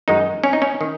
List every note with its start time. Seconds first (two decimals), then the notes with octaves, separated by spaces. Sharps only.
0.08 F#2 D#3 G#3 D#4
0.44 C#4
0.53 D#4
0.62 C#4
0.81 D#3